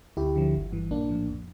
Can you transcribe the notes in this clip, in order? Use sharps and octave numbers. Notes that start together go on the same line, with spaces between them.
D2 E4 G4
D3 F3
G1
G2 E3
A#1 A#3 D4
A2 F3
F2